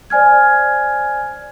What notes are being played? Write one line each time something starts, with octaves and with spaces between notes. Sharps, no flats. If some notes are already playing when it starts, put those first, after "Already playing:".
C5 D5 G#5 F6 G#6